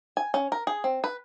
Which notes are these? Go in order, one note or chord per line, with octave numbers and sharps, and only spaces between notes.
G#5
C#4
A#4
G#4
C4
B4